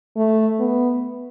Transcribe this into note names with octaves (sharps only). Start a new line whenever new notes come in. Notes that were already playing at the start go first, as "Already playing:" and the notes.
A3
B3